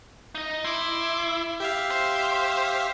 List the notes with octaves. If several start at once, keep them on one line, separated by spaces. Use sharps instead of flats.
D#4 D#5
E4 C6 D6
G4 E5 F5
C5